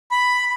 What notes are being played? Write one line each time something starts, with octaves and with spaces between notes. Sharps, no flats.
B5